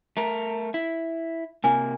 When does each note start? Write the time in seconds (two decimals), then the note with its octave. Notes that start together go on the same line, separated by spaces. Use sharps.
0.17 A3 A#4
0.74 E4
1.64 C3 A#3 E4 G#5